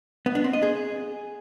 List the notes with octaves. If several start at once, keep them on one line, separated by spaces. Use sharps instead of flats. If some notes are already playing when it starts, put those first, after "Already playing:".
B3
D4
C4
D#5
G#4